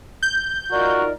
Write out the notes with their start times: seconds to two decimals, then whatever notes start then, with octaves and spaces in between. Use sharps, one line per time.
0.23 G6
0.72 D#4 F4 F#4 A#4 D5